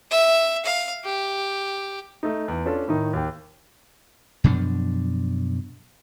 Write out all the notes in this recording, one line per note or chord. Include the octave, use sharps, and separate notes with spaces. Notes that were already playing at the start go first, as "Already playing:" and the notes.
E5
F5
G4
A3 D#4
E2
C#4 D4 F4 A4
A2 D#3 D#4
D#2 G5
F#2 B2 F3 D4